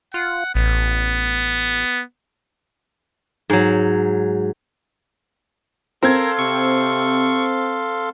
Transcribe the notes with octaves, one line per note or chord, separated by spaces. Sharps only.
F4 F#5
A1 B3
G#2 F#3
C4 A4 A#4 F5 C6 G#6
C3 C#6